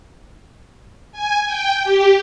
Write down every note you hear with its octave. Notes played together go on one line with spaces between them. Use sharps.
G#5
G5
G4